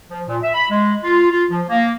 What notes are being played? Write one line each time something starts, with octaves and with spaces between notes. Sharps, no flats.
F3
A#2
E5
B5
G#3
F4
F4
F3
A#3